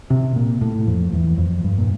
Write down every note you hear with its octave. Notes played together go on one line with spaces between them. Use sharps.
C3
A#2
A2
F2
E2
F2
G2
A#2